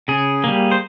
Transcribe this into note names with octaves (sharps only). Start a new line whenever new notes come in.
C#3 G#4
G3 A#3
C5